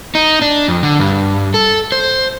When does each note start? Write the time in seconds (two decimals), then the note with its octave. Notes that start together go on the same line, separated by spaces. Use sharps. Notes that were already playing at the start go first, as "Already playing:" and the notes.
0.15 D#4
0.42 D4
0.68 F2
0.83 D3
1.00 G2
1.54 A4
1.92 C5